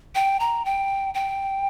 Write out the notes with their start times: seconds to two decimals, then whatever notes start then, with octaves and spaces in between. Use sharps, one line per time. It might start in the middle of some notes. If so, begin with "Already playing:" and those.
0.15 G5
0.40 A#5
0.65 G5
1.14 G5